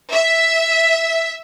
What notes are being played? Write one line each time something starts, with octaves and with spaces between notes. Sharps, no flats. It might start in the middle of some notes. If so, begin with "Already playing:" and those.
E5